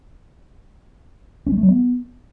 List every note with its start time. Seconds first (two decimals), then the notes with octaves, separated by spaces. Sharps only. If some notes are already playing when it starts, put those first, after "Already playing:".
1.47 C#4
1.52 G#3
1.57 A3
1.63 F#3
1.68 B3